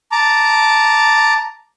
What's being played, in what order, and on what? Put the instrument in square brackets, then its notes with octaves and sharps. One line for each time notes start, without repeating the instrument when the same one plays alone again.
[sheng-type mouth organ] A5 A#5 D6